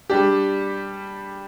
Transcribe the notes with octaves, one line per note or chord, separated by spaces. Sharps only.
G3 D4 G4